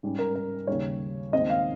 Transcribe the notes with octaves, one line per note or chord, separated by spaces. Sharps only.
G#2 G3 C#4
A#4
A#4
D#2 C#3 G3 C#5
D#2 D#3 G#3 C4 D#4 D#5
F5